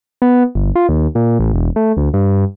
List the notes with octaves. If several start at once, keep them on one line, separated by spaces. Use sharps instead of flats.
B3
G1
F4
D#2
A#2
A1
E1
A3
D2
G2